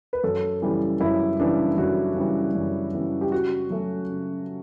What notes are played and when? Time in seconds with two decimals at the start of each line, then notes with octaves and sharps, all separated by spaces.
0.13 B4
0.23 F#2 A4
0.62 C#3 E3 G3
1.00 F#2 E4
1.40 C#3 E3 G3 D4
1.78 F#2 F#4
2.16 C#3 E3 G3
2.55 F#2
2.93 C#3 E3 G3
3.21 G4
3.32 C#3 F#4
3.70 F#3 A3 C#4
4.10 C#3